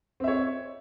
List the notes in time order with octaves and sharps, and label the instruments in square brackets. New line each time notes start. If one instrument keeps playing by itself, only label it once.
[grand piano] C4
E5
C#5